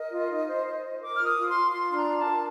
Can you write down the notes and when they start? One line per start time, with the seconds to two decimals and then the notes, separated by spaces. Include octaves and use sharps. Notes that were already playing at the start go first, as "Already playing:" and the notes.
Already playing: A#4 D#5
0.11 F4
0.30 D#4
0.47 C5
0.65 C5
0.83 C5
1.00 A#4 D6
1.16 F4 F6
1.23 D#6
1.36 F4
1.48 C6
1.54 F4
1.71 F4 C6
1.88 D4 C6
1.95 A#5
2.07 F4
2.18 A5
2.25 A#4